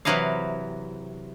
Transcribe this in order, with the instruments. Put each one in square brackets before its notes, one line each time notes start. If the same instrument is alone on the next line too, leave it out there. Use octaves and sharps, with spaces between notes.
[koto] C3 E3 F#3 E4 D#5 F5